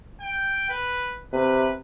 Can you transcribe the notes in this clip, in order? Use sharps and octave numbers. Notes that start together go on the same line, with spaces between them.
G5
B4
C3 B4